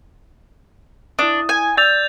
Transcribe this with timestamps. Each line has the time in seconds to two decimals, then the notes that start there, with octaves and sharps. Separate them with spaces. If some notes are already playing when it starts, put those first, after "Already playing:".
1.19 D4 E4 D#6
1.49 G#5
1.77 D5 E6 G6 A6 F7